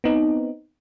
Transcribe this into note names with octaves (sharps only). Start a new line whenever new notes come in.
B3 C4 D#4